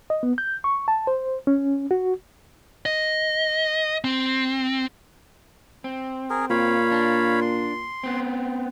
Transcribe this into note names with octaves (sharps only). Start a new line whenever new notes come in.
D#5
B3
G6
C#6
A5
C5
C#4
F#4
D#5
C4
C4
G#4 A#4
A#2 C#5 F5 B5
D4
C6
B3 C4